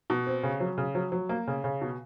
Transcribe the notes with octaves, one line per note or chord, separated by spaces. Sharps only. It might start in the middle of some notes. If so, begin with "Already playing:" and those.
B2
C4
C#3
F#3
C#3
F#3
F#3
A#3
C#3
C#3
B2